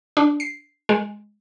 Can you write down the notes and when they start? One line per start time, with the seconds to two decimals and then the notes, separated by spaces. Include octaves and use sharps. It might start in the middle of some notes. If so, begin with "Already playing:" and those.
0.17 D4
0.40 C7
0.89 G#3